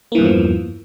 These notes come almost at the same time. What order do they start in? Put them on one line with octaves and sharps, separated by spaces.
A#3 E3 G2 E2 F3